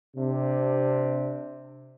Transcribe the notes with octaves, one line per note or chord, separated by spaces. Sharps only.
C3 D4